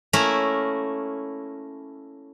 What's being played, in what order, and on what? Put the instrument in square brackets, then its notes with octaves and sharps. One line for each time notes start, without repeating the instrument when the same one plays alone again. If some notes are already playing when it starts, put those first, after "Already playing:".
[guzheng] A3 A#3 C#4 E4 A#4